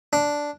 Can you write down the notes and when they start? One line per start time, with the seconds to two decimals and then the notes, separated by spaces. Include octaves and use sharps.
0.13 D4